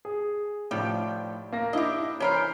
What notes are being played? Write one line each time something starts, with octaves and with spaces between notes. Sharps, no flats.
G#4
A2 D#3 F3 G3
A#3 A#6
D4 E4 G4 D#5
E3 C#4 A#4 C5 B5 F6